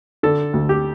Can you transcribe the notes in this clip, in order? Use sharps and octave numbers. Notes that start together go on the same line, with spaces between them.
D3 A4
D2
G4